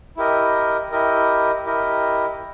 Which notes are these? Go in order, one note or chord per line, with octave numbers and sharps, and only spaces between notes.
E4 G4 A#4 D#5
E4 G4 A#4 D#5
E4 G4 A#4 D#5